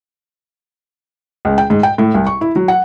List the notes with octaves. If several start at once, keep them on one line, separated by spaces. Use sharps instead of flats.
C#2
G5
G#2
G5
A2
C2
C#6
E4
F#3
F#5